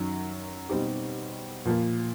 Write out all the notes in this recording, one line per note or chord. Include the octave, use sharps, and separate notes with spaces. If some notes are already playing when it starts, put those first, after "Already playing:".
Already playing: F#2 D#3 F#3
B2 G3 C4 D#4 G4
A#2 F3 A#3